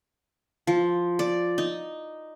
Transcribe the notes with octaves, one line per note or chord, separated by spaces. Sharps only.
F3
D5
D#4